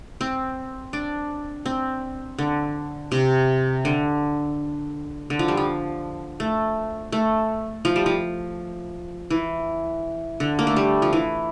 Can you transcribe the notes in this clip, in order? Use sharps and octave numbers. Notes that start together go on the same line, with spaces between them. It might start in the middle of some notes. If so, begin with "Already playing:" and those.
C4
D4
C4
D3
C3
D3
D3
F3
G3
F3
A3
A3
F3
G3
F3
E3
D3
A#3
A3
G3
F3
E3